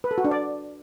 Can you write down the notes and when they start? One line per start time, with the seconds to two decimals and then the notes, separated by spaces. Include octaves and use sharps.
0.04 B4
0.11 A4
0.18 F#4
0.25 D4
0.31 D5